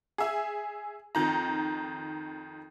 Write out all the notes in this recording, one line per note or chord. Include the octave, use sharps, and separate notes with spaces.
G#4 E5
F2 D#3 A#5